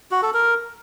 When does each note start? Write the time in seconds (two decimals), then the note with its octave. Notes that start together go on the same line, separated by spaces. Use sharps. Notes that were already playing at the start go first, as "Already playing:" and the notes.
0.11 F#4
0.22 A4
0.34 A#4